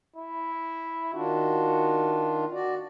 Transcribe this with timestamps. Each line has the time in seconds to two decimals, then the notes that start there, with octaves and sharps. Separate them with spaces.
0.16 E4
1.14 D#3 D4 F4 F#4
2.52 F#4 D5